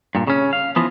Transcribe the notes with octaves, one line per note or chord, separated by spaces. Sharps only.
G2 A#2
C#3 C#4
F5
E3 F3 B3